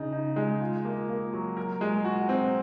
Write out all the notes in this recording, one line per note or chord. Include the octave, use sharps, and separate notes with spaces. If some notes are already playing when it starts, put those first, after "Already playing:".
Already playing: C#3 D#4
D#4
G#3
F4
A#3
A#3
F#3
A#4
G#3
F#4
C4